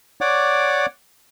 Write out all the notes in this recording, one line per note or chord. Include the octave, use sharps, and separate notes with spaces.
C#5 D5 F#5 D6